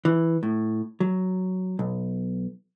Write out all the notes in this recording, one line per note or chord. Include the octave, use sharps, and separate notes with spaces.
E3
A2
F#3
B1